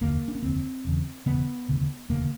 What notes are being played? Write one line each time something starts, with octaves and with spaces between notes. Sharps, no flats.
F1 D#2 D3 A#3
D4
C#4
F1 D#2 D3 C4
E1 E2 C#3
E1 E2 C#3 B3
E1 D2 C#3
E1 D2 C#3 A#3